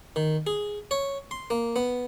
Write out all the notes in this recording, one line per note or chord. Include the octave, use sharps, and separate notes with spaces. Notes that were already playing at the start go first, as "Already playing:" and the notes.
D#3
G#4
C#5
C6
A#3
B3